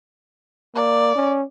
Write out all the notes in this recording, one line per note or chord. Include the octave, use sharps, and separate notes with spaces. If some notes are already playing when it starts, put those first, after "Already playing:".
A#3 D5
C#4